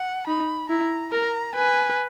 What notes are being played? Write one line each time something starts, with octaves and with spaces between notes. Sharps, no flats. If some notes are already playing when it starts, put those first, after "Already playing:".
Already playing: F#5
D#4 B5
E4 A#5
A#4 A#5
B4 G#5